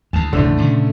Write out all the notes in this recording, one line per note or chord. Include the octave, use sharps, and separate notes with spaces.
D2 G#3 A5
E1 C#2 G#2 D3 A3
A#2 C#3 C#4